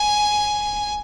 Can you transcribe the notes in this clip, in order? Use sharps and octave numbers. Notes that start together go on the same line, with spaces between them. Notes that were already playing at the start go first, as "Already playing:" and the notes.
Already playing: G#5